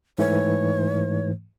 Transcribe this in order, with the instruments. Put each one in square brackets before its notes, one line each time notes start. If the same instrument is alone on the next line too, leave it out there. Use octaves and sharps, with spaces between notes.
[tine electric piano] G#2 E3 A3 [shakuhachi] C#5